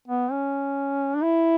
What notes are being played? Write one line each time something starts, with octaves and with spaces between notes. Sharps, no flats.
B3
C#4
D4
E4